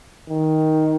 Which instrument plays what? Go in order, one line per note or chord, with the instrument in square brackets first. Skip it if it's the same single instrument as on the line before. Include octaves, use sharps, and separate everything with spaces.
[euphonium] D#3